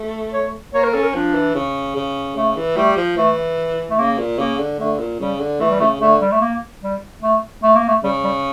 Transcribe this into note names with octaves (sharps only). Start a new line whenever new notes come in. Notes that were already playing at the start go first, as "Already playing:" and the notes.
Already playing: A3
C#5
A#3 C#5
A#4
C#4 A4
A#4
F3 D4
E3
C#3
C#3
C#3 A3
E3
G3 A3
F3
E3 A3
A3
C#3 A#3
A#2
C#3 A#3
D3
D3 A3
A#2
C#3 G3
D3
E3 A3
G3
C#3 A3
D3 A3
G3
A3
A#3
G3
A3
A3
A#3
A3
C#3 G3
G3